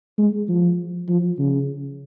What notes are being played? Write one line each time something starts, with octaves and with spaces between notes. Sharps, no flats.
G#3
F3
F3
C#3